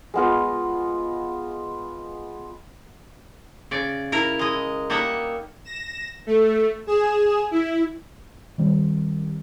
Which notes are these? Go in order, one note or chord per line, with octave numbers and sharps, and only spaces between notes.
G#3 B3 F4
C#3 D5
E4 A#4
G#3 D#5
G3 A#3 D#4 E5 F#5
A#6 E7
A3
G#4 E7
E4
D#3 G3 C4